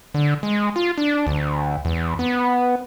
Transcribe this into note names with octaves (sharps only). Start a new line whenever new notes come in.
D3
G#3
F4
D4
D2
E2
B3